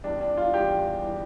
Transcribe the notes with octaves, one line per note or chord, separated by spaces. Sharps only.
E2 E3 G3 D4
D4
F4
E2 E3 G3 G4
E3 G3